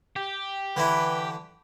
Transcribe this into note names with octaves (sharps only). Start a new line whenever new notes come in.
G4
D3 E3 E4 B4